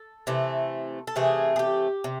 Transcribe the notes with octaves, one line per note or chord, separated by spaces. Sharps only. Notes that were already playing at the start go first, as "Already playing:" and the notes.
Already playing: A4
C3 E3 A3
A4
C3 E3 A3 G#4
G#4
G4
C3